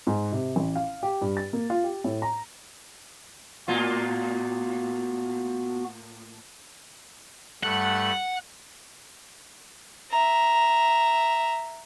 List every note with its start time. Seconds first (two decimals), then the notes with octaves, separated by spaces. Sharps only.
0.07 G#2
0.32 C3
0.56 A1
0.76 F5
1.03 G4
1.21 G2
1.37 A6
1.53 A#3
1.70 F4
1.84 G4
2.04 A2
2.22 A#5
3.68 A2 A#3 B3 F4 F#4
7.63 G2 A3 F#5
10.11 E5 A#5